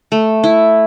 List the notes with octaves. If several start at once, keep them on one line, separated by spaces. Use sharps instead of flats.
A3
E4